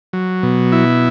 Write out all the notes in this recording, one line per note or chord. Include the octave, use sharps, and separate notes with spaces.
F#3
B2
E4